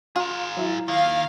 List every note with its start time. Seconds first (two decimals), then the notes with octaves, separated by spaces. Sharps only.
0.16 F4 G#4 A#4
0.57 F#3 E4
0.88 D#3 A#3 F5